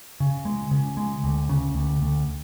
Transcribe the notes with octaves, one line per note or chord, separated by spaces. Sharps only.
C#3
G#3
C#3
G#3
D2
C#3
D2
D2